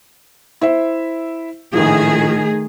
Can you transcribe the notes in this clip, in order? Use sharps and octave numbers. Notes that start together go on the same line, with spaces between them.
E4 C5 E5
A#1 A2 D#3 F3 A3 G#4